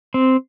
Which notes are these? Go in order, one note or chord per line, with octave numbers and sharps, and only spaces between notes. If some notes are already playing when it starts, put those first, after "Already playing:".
C4